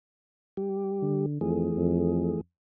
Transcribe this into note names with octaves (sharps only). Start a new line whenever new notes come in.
G3 G4
D3
F2 E3 A3 G#4
F2